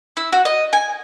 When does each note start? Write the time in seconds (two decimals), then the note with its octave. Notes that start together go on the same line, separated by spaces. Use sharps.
0.17 E4
0.32 F#4
0.45 D#5
0.73 G#5